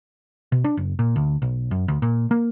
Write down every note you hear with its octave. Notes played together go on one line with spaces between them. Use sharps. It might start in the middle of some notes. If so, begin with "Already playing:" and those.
B2
D4
F#1
A#2
D2
B1
F#2
D2
A#2
A#3